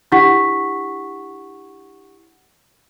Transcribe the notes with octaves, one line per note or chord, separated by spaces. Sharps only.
D4 E4 G4 F#5 C#6 B6